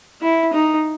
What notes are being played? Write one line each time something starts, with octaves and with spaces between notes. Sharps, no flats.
E4
D#4